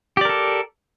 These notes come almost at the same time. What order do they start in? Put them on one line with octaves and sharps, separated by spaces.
G4 D5 A#4 A4